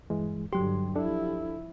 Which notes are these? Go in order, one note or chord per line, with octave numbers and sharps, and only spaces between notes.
G2 E3 G#3
G2 D3 F#3 G4 C6
F3 D4 E4 A4